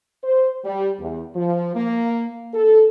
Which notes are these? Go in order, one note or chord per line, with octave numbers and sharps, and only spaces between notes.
C5
G3
E2
F3
A#3
A4